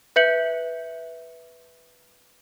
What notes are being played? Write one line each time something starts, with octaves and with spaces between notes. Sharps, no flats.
B4 E5 G6 C#7 F#7